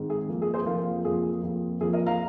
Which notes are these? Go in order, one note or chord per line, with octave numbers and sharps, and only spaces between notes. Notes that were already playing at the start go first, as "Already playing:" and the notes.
Already playing: G#2 D#3 C4
G#4
F2 F3 A#3
G#4
G#4 C5
F2 F3 A#3 F4 A#4
F2 F3 A#3 G#4
F2 F3 A#3
F2 F3 A#3 G#4
A#4 D#5
F5 A#5